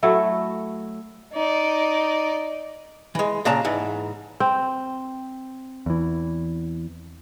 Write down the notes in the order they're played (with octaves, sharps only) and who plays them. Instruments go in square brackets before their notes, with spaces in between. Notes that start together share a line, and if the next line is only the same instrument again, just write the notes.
[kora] F#3 A3 E4
[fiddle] D#4 D5
[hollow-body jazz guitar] E3 G#3
A#2 C#3 D4 A5 A#5
G#2 E3
[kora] C4
[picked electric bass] E2 E3